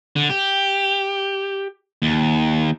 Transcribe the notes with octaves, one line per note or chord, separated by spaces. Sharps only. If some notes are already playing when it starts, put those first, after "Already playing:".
D3
G4
D#2